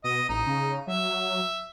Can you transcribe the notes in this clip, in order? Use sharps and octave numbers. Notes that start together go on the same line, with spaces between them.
B2 D#5
A1 D#4
C#3
F#3 E5